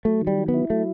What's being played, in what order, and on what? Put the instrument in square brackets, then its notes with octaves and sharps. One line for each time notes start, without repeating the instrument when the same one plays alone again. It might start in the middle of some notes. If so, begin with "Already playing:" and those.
[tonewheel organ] F#3 [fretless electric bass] A3
[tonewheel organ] D#3
[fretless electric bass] G3
[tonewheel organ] F#3
[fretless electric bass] B3
[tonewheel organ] E4
[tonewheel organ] F#3 [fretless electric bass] A3